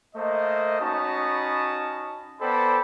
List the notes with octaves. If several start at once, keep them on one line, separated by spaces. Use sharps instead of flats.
A3 A#3 C5 D#5
C#4 D#4 F#4 A5 B5 D#6
B3 A4 C5 D5 G5 B5